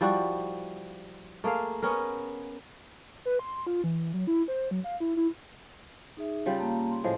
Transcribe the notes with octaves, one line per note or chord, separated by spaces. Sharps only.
F3 G3 E4 F#4
A3 A#3 G#4 F5
B3 C#4 A#4
B4
C6
F4
E3
F#3
E4
C5
F#3
F5
E4
E4
D#4 G#4 E5
C#3 G3 F4
A#3 A5 A#5
C6
A2 F3 G#3